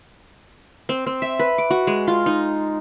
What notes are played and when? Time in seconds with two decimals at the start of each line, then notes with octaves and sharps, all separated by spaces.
0.89 C4
1.06 C4
1.22 E5
1.39 B4
1.58 D6
1.70 F#4
1.87 G#3
2.07 F4
2.26 D#4